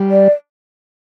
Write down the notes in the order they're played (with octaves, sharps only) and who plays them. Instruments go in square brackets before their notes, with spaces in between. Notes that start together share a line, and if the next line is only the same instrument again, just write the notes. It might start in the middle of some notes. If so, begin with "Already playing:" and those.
Already playing: [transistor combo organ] G3
[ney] D5